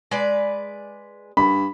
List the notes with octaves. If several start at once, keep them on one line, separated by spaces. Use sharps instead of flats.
G#3 B4 D5
G2 B5